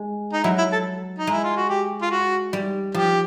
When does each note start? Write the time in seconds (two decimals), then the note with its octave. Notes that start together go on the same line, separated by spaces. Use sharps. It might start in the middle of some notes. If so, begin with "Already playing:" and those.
Already playing: G#3
0.33 D#4
0.44 F#3 E4
0.58 E4
0.72 A4
1.19 D#4
1.27 G#3 E4
1.44 F4
1.57 F#4
1.69 G4
2.02 F4
2.11 F#4
2.53 G3
2.94 F3 G4